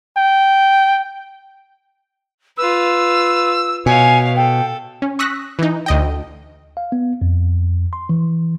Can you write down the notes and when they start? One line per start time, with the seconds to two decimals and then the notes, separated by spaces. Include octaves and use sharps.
0.17 G5
2.57 F4 B4 E6
3.86 B2 C#5 F5 G#5
4.36 A4 G5
5.02 C#4
5.19 C#6 D#6 E6 F#6 A#6 B6
5.59 E3 D#4
5.86 D2 D#5 G5
6.77 F5
6.92 B3
7.21 F2
7.93 C6
8.09 E3